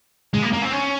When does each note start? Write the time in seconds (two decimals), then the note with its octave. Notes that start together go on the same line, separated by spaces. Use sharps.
0.34 G#3
0.42 A#3
0.53 A#3
0.62 C4
0.72 C#4